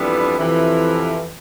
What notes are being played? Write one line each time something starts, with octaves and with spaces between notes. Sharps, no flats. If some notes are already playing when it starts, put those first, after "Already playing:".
Already playing: F2 E3 G3 B3 D4
F2 C3 E3